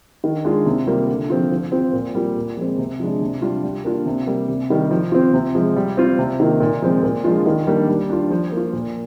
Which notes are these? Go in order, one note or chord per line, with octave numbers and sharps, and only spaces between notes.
D#3
G#3 D4 F4
C3
G3 A#3 F4
D3
F3 C4 F4
F3
C4 F4
A#2
G3 A#3 F4
A#2
F3 G#3 C4
C3
F3 G#3 D4
C3
G3 D4 F4
G3
A#3 D4 F4
C3
G3 A#3
C3
D#3 G3
F3
C4 F4
C3
F3 G#3
G3
C4 F4
C3
D#3 A#3 F4
A#2
F3 G#3 C4
A#2
F3 G#3 D4 F4
D#3
G3 A#3 D4
G3
D4 F4
F3
A#3 F4
A#2